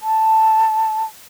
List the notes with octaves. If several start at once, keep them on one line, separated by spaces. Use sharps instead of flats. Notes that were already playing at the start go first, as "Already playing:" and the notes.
A5